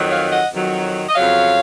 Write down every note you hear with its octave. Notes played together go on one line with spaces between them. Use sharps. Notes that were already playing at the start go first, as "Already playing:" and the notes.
Already playing: F2 D#3 F#3
C#5 F5
D#5 F#5
F2 D#3 F#3
D#5
F2 C#3 F#3 C#5 F5